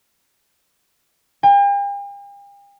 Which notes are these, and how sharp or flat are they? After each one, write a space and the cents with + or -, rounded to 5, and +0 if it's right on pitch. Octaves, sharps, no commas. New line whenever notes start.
G5 +45